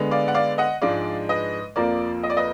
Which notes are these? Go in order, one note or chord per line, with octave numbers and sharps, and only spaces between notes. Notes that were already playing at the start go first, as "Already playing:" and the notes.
Already playing: D3 G#3 B3
D5 F5
F#5
D5 F5
D#5 F#5
G#2 F3 G#3 D4 D5 F5
B4 D#5
F2 F3 A#3 F4 A#4 D5
D#5
D5
B4 D#5